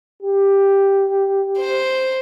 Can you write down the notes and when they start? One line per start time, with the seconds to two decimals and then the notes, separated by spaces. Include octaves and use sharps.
0.22 G4
1.58 C5